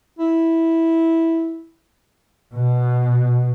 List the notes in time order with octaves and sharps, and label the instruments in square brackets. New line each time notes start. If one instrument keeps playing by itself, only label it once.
[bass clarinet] E4
[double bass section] B2